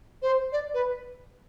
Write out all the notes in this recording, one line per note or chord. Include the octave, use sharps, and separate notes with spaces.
C5
D5
B4